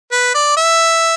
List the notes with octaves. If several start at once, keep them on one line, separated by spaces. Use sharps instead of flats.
B4
D5
E5